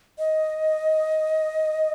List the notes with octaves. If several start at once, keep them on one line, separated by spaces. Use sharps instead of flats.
D#5